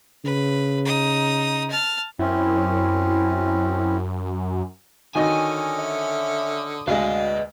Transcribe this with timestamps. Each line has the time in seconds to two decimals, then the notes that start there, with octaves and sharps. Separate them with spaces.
0.25 C#3 B4
0.85 D#4 D#6
1.70 A5 F6
2.19 F#2 C4 C#4 E4
5.15 D3 D#3 C#4 F#4 D#5 G#5 D#6
5.79 E5
6.87 D2 G#3 B4 D5 D#5 F5